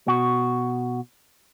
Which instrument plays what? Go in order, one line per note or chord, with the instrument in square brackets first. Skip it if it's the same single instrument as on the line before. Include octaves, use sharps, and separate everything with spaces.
[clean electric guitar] B2 F#4